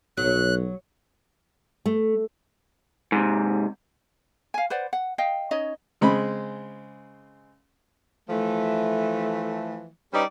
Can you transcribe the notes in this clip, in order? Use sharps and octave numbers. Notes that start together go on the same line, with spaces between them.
B1 F#3 F#6
A3
G#2 C3
F5 G#5
B4 C5 D5 F#5
F#5
D#5 F5 G5
C#4 D#4 C#5 D#5
C#3 G#3 C4 B5
E3 F3 A3
G3 C#4 D#4 B4 D5